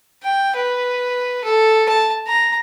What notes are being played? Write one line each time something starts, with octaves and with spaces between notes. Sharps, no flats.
G5
B4
A4
A5
A#5